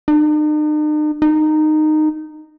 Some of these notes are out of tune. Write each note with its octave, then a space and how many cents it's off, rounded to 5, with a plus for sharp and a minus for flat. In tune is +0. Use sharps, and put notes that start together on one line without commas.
D#4 -45
D#4 -15